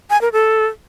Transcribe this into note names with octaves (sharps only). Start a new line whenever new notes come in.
G#5
A#4
A4